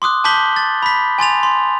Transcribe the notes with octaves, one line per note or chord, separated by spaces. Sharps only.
C6 D6 D#6 F#6
A5 D6 G6 B6 F#7 G7
A6
B5 B6
G#5 C6 A6 F7
C6